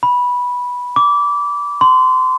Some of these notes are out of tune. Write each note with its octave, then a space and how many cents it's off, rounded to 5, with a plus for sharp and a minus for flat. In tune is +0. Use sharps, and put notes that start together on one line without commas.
B5 -10
D6 -20
C6 -30